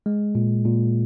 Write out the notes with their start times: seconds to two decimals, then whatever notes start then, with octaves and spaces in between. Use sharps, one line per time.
0.06 G#3
0.35 A#2
0.65 A#2